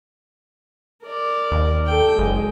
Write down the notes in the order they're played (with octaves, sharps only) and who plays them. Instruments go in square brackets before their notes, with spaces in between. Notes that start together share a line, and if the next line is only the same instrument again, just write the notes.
[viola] A#4 D5
[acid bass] D#2
[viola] A4 G5
[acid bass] F#1 [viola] G#3